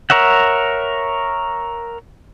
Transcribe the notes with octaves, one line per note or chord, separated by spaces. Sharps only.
A#4 C#5 E5 F#5